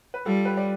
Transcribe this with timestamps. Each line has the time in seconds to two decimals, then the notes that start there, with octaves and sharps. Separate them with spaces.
0.14 B4
0.26 G3 F4 A4
0.45 G4 B4
0.57 D5